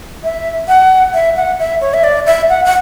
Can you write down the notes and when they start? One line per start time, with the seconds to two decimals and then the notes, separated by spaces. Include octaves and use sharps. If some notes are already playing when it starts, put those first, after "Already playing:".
0.24 E5
0.68 F#5
1.14 E5
1.36 F#5
1.59 E5
1.81 C#5
1.94 E5
2.04 D5
2.26 E5
2.49 F#5
2.65 F#5